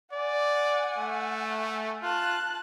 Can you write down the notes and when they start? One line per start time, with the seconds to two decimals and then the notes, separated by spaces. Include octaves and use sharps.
0.12 D5 F#5 G#5
0.98 A3
2.03 F4 A5 F#6